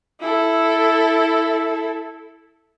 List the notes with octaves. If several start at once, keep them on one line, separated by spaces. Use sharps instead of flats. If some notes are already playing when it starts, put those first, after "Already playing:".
E4 A4